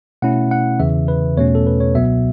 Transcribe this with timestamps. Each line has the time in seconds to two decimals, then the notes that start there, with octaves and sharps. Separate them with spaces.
0.22 B2 A3 C#4 E4 F#5
0.51 F#5
0.80 E2 C#3 E3 E5
1.08 B4
1.37 E2 B2 A3 C#4 C#5
1.55 A4
1.67 B4
1.81 C#5
1.95 C#2 B2 F#3 B3 E5